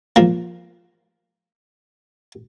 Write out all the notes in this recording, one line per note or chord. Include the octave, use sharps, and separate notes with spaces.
F3 A#3